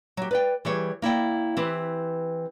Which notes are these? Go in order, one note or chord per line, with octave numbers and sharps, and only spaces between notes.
F#3 G4
B4 D5 G5
E3 G3 G4 G#4 C#5
A#3 E4 D5 G5
E3 C4 G4 B4